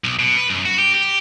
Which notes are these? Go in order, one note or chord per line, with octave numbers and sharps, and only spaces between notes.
B1
B2
B4
F#2
F#4
G4
G4